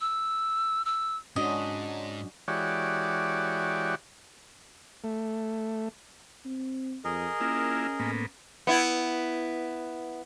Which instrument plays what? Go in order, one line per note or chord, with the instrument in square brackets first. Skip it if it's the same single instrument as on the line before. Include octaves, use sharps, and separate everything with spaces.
[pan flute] E6
E6
[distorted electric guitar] G#2 [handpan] C#4 D4 F#4 [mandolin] D#5
[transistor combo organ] E3 G#3 F#4 G4 C#5 D5
A3
[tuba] C4
[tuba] F2 [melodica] G#4 A#4 D#5
[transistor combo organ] A#3 E4 F4 [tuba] C#4
[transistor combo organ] A2 A#3 B3
[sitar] B3 E4